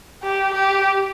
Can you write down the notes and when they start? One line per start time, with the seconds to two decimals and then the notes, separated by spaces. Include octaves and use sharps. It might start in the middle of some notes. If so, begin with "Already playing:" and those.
0.23 G4
0.55 G4